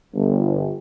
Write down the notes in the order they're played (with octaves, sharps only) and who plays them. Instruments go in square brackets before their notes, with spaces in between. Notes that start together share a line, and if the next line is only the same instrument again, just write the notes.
[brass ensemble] G1